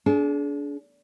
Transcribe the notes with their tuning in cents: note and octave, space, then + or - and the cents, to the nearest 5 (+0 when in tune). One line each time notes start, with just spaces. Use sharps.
D4 -30 G#4 +35